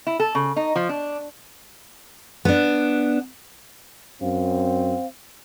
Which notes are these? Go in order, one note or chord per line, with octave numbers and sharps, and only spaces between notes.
E4
A4
C#3
D#4
F3
D4
B3 D4
F#2 C4 F5